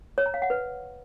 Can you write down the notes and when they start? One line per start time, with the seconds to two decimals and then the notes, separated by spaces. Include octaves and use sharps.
0.18 C#5
0.26 A#5
0.34 F5
0.42 F#5
0.50 B4